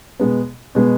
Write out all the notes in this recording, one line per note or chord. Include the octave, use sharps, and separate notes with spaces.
B2 G#3 B3
B2 G#3 B3